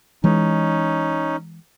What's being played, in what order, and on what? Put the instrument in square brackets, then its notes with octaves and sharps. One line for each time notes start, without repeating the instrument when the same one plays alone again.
[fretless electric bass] E3 G#3 [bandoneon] C#4 D#4